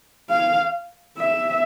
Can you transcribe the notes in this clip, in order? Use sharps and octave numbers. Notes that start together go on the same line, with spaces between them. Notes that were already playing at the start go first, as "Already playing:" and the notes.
F5
E5